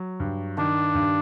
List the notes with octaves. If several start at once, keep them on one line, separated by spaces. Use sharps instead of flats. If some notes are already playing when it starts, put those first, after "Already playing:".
Already playing: F#3
G2
D#3 D4
G2